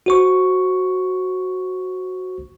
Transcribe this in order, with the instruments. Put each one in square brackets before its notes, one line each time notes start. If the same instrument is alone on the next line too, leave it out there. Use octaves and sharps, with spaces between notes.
[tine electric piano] F#4 C5 C#6